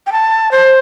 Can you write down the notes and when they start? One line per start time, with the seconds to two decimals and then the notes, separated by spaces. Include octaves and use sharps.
0.07 G5
0.12 A5
0.52 C5